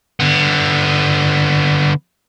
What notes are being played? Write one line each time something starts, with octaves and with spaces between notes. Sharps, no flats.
D3 B3